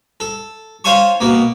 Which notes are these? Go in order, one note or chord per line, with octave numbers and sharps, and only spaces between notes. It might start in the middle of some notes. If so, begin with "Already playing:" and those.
A4
C5 C#5 F5 G#5 A5 C#6
B2 A#3